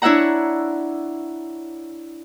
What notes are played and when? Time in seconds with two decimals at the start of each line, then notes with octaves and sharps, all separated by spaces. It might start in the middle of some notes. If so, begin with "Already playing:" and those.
0.02 D4 E4 C#5 E5 F#5 A#5